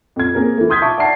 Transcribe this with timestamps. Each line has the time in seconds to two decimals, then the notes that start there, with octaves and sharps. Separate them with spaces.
0.16 F2 G#6
0.35 A#3 C4 G#4 A#4
0.57 E3 A3
0.70 C6 D#6 G6 G#6 B6
0.82 E5 A5 C#6 D6
0.98 D5 E5 F#5 A5 C7